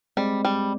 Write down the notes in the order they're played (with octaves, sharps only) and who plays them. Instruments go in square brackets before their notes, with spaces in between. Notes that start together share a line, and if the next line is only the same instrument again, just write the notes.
[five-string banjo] G3 [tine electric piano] G#3 C4
[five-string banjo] G3